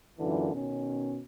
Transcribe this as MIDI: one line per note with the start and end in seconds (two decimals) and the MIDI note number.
0.19 0.52 42
0.19 0.52 46
0.19 0.52 50
0.19 0.52 52
0.54 1.20 47
0.54 1.20 51
0.54 1.20 61